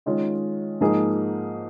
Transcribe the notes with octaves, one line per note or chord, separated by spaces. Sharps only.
D#3 G#3 C#4 F4
G#2 F3 A#3 D#4 G#4